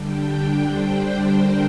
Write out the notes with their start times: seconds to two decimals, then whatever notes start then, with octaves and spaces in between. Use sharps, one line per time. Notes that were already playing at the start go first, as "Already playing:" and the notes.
Already playing: D3 G3 D4 G5
0.61 C5
1.32 A#4